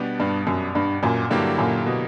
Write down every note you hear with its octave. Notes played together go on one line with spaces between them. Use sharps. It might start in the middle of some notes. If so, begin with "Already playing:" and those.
Already playing: B2 G3 B3 D4 G4
G2
F#2
G2
F#2 A#2
G2 D3 F#3 A#3 E4 G4
F#2 A#2
B2